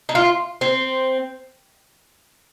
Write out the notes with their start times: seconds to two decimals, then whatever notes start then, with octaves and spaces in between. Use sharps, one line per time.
0.09 D#4
0.15 F4
0.61 C4